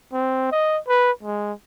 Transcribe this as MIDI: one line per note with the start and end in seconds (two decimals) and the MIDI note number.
0.13 0.48 60
0.52 0.79 75
0.88 1.12 71
1.23 1.53 56